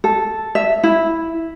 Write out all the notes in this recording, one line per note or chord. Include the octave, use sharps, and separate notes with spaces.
A4
E5
E4